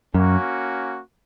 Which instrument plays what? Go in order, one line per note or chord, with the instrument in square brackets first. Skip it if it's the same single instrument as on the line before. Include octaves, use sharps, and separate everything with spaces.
[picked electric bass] F#2 [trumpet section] A#3 C#4 F#4